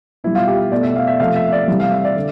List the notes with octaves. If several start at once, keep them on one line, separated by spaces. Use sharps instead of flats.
B2 G3 E4
F4
G4
B2 A3 D5
E5
F5
E5
C3 F3 A3 F5
E5
D5
C3 E3 G3
F5
E5
D5
D3